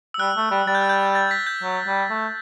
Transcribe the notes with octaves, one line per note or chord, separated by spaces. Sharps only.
E6
G3 F#6
A3
G3
G3 A6
G6
F#6
G6
A6
B6
G6
F#3
G3
A3